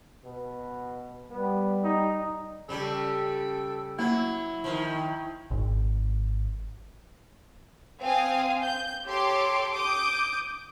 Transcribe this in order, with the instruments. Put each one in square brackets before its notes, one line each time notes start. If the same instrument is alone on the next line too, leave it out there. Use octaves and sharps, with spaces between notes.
[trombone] B2
[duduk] G3 [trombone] B3
[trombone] D#4
[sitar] C#3 G3 [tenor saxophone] A4
[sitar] F#3 [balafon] A#3 [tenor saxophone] E4
[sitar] D#3 F3
[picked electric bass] G#1
[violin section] C4 F5 G#5 D#6
G6
G4 A4 C#5 C6 D6
D6 D#6 G6